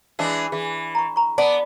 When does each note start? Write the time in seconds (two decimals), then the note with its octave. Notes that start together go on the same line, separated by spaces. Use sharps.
0.19 E3 G#3 D4
0.52 E3 G#4
0.95 A#5 C#6
1.16 A#5 C#6
1.38 B3 D5 A5